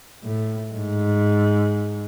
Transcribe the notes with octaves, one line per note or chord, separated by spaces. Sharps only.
A2
G#2